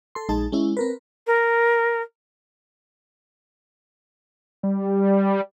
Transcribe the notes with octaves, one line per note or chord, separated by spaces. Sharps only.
A4 C6
A#1 G#3 D#4 G#4 A5
G#3 C#4 E4
C4 A#4 B4
A#4
G3